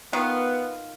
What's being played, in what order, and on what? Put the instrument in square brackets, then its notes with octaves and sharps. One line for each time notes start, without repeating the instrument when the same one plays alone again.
[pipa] D#3 F4 [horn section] B3